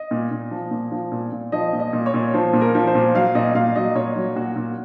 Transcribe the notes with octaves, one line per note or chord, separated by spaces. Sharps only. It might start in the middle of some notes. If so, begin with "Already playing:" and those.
Already playing: D#5
A#2
A#2
F3
A#2
F3
A#2
A#2
F3 D#5
A#2
D#5
A#2
C#5
A#2
F3 C5
A#2
A#4
F3
C5
A#2
F#3 F5
A#2 D#5
A#2 F5
F#3 D#5
A#2 C#5
F#3
A#2 F#4
A#2